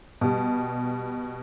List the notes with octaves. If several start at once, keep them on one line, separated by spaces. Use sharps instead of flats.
B2 G3